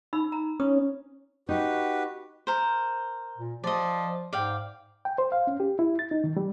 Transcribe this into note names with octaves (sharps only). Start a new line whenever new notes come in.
D#4 B5 E6
A#5
C#4 D#6
D#4 F#4 G4 B4
A#4 C5
A#2
F3 D5 D#5
G#2 D5 F5 G5
G5
C5
F5
C#4
G4
E4
A6
D#4
D#3
G3